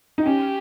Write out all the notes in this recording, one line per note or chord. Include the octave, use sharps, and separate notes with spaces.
D#4
C#4 G4